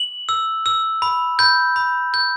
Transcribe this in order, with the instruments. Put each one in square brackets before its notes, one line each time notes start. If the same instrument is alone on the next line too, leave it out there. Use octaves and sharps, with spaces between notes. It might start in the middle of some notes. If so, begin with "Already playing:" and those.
Already playing: [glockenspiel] F#7
E6
E6
B5
B5 G6
B5
G6